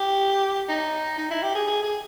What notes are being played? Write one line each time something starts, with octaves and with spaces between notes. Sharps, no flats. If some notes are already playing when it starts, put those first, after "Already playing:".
Already playing: G4
D#4
D#4
E4
G4
G#4
G#4
G#4